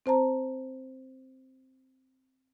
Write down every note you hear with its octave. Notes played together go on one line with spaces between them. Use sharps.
C4 C5 A5 A#5